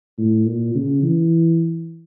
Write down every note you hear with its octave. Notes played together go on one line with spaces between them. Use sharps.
A2
A#2
C#3
E3